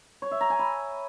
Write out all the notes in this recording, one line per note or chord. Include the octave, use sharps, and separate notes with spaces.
C#5
E5
A#5
G#5
B5